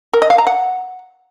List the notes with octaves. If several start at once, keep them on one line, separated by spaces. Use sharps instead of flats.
A#4
D#5
F5
A#5
F#5